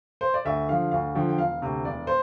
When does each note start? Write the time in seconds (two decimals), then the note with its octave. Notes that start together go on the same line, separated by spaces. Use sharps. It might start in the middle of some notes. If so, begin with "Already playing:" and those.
0.21 C5
0.34 D5
0.45 D2 E5
0.69 D3 F3 F5
0.91 D2 F5
1.15 D3 F3 G5
1.29 G5
1.38 E1 F5
1.62 D2 C3
1.85 E1 D5
2.07 C5